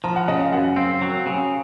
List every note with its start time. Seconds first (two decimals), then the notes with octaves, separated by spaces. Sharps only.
0.04 F3 A#5
0.16 F#5
0.28 C#3 D#5
0.40 F5
0.52 F#2 F#5
0.76 C4 F5
1.01 F#3
1.26 C#3